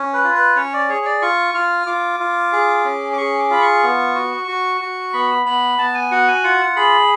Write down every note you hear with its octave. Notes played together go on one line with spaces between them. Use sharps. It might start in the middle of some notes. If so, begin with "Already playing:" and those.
Already playing: C#4
B4
F4
B4
C#4 C#5
D5
G#4 C#5
D5
F4 C#6
F4 F6
F4 D6
F4
G#4
C#4
D6
G#4 C#6
D6
F4 B5
C#6
B3
F#4
F#4
F#4
B3 B5
B3 B5
B3 A5
G#5
F#4 F#5
G#5
F4 F#5
G#4 B5